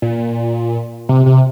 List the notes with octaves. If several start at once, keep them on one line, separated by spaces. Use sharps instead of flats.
A#2
C3
C3